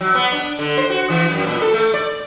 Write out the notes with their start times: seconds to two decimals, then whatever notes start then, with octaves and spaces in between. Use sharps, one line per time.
0.01 F#3
0.15 B3
0.32 D4
0.59 D3
0.78 C5
0.90 F#4
1.10 E3
1.31 F#2
1.47 A#2
1.62 A4
1.74 A3
1.94 D5